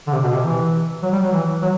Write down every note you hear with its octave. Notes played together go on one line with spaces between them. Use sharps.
D3
C3
B2
C3
E3
F#3
G3
F#3
E3
F#3